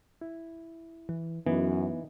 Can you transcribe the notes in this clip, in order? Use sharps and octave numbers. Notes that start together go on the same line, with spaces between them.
E4
E3
F#2 E3 B3 D#4